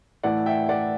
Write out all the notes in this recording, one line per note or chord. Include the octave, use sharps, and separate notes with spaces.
A2 E3 A3 E4 D5 F#5
E5 G5
D5 F#5